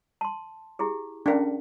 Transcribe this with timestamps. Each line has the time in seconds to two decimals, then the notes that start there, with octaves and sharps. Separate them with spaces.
0.21 A5 C6
0.79 E4 G4 G#4
1.26 C#4 D4 A#4 F5 G5